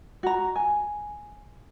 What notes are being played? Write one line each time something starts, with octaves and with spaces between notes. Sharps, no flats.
F#4 A#5
G#5